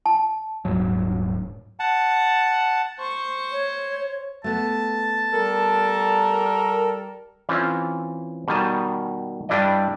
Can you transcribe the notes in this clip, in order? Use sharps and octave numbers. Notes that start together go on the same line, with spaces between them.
A5
D#1 G#2 F#3
F#5 A5
C5 C#6
C#5
A3 B3 A5
G3 A4 A#4
E3 C4 C#4 F4
B2 D#3 G3 G#5 A5
G2 G3 D4 E4 D5 D#5